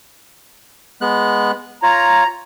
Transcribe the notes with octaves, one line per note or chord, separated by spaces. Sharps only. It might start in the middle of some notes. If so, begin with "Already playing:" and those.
G#3 B3 F#6
F4 C#5 A#5